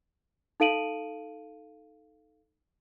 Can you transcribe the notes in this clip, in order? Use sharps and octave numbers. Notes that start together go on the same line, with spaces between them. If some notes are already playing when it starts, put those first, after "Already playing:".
D#4 A4 F5 D7 D#7 F#7